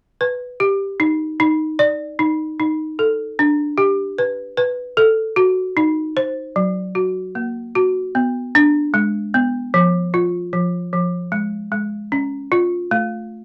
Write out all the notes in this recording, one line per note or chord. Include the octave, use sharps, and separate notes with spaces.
B4
G4
D#4
D#4
D5
D#4
D#4
A4
D4
G4
B4
B4
A4
F#4
D#4
C5
F#3
F#4
A#3
F#4
B3
D4
G#3
B3
F3
F4
F3
F3
G#3
G#3
C#4
F4
A3